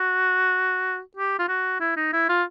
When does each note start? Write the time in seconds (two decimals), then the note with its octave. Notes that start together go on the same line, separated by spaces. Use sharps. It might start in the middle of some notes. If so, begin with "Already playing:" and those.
Already playing: F#4
1.16 G4
1.39 F4
1.48 F#4
1.80 E4
1.96 D#4
2.13 E4
2.29 F4